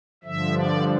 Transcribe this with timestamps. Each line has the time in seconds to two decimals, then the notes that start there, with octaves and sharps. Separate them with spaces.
0.24 G2 D3 F3 E5
0.53 D5